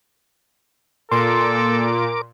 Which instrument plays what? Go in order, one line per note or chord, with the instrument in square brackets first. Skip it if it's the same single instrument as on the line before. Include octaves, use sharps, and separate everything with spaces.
[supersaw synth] A#2 [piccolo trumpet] A4 [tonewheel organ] A#4 D6 [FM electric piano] C6